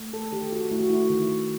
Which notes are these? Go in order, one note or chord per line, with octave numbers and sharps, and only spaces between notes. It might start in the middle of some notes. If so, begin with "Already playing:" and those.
Already playing: A3
A4
D#3 G4
F#4
A3 E4
F#4
E4
D#3